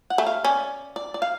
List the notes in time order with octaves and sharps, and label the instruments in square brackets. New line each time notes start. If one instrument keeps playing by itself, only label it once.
[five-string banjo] F#5
[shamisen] A3
[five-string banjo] F5
[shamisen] C#4 [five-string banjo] D5
[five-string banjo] D5
D5
F5